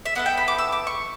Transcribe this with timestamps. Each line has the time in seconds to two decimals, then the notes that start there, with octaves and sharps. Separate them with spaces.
0.05 E5
0.15 B3 E4 A4 F#5
0.26 G5
0.37 B5
0.48 D6
0.58 E6
0.72 D6
0.87 C#6